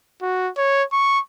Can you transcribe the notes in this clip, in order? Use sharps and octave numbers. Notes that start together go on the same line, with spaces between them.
F#4
C#5
C#6